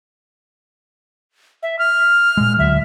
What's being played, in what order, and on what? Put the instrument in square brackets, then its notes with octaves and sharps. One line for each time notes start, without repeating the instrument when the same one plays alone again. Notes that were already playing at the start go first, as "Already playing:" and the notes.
[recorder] E5
F6
[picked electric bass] A#2 G#3
[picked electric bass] D2 D3 F#3 [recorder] E5